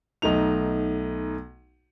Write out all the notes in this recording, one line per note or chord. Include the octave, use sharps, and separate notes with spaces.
B1 A3 D#4 F7